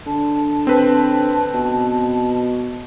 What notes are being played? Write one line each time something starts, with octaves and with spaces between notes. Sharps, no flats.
D3 A5
C4 B4
B2